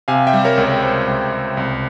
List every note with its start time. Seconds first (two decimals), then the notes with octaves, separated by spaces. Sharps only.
0.08 C3 F5 G#5
0.27 E5 G5
0.33 G3
0.45 A#4 C#5
0.58 C#2
0.64 A#4
0.82 C#2 C5
1.08 C#2
1.32 C#2
1.57 C2